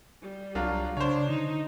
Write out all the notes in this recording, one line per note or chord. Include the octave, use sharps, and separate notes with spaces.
G3
C2 F#3 D4 F4
C#3 D4 C5 C#5
D3 D#4